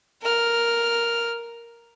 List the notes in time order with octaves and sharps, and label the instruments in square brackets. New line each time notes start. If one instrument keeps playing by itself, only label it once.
[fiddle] A#4 F6